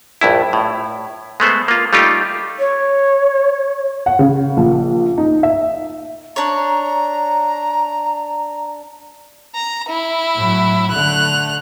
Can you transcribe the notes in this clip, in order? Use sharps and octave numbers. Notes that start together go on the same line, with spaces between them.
A#1 G2 E4
A2
G#3 A3 B3 C5
A#3 F4
G3 A3 D#4 F4 G4
C#5
F#5
C#3
A#1
D#4
E5
D4 C#5 A#5
A#5
E4
A2 F#3
D3 A3 F#6 F7